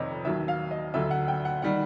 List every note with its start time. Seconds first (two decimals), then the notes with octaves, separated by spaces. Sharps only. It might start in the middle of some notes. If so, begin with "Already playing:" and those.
Already playing: F1 F2 C3 D#3 C#5 D#5
0.25 D#2 D#3 F#3 E5
0.48 F5
0.71 D#5
0.94 D2 D3 F#3 E5
1.11 F#5
1.28 G5
1.45 F#5
1.62 D#3 G3 F#5